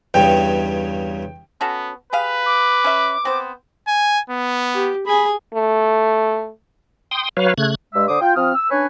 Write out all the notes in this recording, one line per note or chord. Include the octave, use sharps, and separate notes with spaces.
E2 G2 C#3 G5
B3 C#4 F#4 A4
G4 G#4 B4 F5
D6
C#4 E5
B3 C4 C5
G#5
B3
G4
G#4 G#5 B5
A3
G5 C6 D#6
F#3 B4 C#5 F5
C#3 A3 F#6 G#6
G2 G#3 E5 E6
D3 C5 D6 D#6
F4 G5
F3 C4 D#6 F6
E6
C#4 D4 B4 C#5 G#5